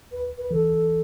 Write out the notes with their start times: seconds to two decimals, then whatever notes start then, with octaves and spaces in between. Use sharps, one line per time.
0.12 B4
0.37 B4
0.51 E3 A4